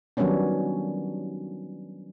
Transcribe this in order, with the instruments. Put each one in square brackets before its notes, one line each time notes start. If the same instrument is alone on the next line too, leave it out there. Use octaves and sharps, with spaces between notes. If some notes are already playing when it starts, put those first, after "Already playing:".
[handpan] D#3 F#3 G3 B3 C#4 D4